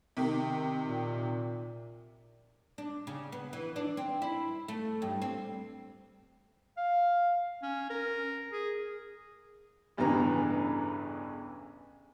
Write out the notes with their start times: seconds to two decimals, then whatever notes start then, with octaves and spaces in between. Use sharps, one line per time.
0.17 C3 D#3
0.85 A#2
2.78 D4
3.07 C#3
3.32 B3
3.53 E3
3.76 D4
3.97 C4
4.22 E4
4.68 A3
5.02 G2
5.22 C4
6.77 F5
7.63 C#4
7.90 A#4
8.52 G#4
9.97 A1 E2 G2 C#3 E3 A#5